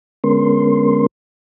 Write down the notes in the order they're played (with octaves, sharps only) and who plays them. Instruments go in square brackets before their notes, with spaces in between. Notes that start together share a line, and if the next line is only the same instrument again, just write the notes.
[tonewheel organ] D3 G#3 B3 C#4 A#4 C6